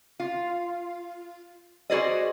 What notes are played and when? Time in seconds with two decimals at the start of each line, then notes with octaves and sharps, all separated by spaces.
0.20 F4
1.90 F#4 G#4 B4 C5 D5 D#5